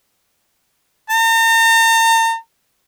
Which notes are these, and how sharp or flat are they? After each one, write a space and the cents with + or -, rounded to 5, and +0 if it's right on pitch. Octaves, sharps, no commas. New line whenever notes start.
A#5 -45